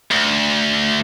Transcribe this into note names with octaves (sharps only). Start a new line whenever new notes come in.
D2